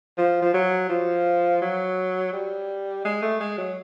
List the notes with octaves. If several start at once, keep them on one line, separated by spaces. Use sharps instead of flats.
F3
F3
F#3
F3
F#3
G3
G#3
A3
G#3
F#3